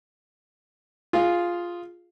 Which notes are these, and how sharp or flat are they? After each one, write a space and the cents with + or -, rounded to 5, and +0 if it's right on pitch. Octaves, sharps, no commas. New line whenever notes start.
F4 +0 G#4 +0 F5 +0